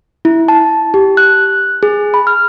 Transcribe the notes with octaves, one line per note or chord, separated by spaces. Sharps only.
E4
A5
G4
F#6
G#4
B5
F6